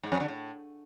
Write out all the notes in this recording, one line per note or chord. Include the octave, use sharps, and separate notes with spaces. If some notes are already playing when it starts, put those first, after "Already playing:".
G#2
F2
D3
A2